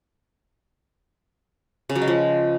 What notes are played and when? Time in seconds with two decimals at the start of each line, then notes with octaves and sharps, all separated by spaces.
1.89 C#3
1.96 F#3
2.02 G#3
2.08 F3